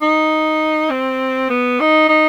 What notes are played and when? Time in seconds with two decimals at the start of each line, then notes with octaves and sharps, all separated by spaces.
0.02 D#4
0.90 C4
1.50 B3
1.80 D#4
2.09 D#4